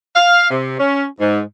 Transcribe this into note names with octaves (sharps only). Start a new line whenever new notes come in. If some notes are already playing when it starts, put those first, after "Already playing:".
F5
C3
C#4
G#2